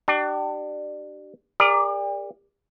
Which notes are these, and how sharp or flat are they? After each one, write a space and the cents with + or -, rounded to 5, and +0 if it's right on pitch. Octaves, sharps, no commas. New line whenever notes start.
D4 +25 G4 -30
G4 +45 A#4 +0 D5 +0